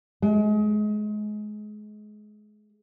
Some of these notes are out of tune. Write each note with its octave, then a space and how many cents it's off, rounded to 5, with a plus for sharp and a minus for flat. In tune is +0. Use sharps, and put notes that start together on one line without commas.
G#3 +25